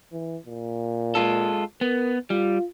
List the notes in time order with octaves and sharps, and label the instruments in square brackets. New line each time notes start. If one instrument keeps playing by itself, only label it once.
[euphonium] E3
A#2
[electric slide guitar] G#3 F4 A4
[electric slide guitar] B3 [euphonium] A#4
[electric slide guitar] G3 [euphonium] F4